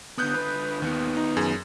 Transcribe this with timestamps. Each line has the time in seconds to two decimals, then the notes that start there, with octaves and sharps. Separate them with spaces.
0.18 D3 B3 D#6 F#6 G6
0.34 D3 B4
0.82 D#2 D#3 B3
1.17 D#4
1.37 F#2 G#4